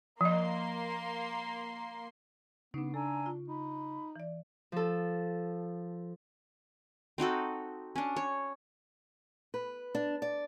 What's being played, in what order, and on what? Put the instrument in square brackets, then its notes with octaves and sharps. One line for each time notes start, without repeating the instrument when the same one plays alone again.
[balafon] F3 D#5 [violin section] A#3 C6
[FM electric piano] C#3 [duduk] B3 [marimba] D4 D#4
[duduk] D4 [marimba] A4 [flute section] G#5 A#5 E6
[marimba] F4
[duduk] D#4 [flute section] B5
[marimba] E3 D5
[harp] F3 A4
[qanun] C4 D#4 F#4 A4
C#4 D4
C#5
[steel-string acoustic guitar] B4
D4
D5